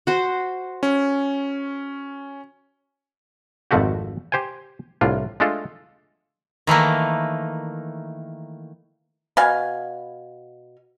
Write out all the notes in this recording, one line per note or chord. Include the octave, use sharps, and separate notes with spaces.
F#4 C5
C#4
G#1 F2 F3 A3 F#4 G4
G4 C5 G5 G#5
C2 A2 D4 F4
G#3 A3 D4 F4 A4
D#3 E3 A3 A#3
B2 F5 G#5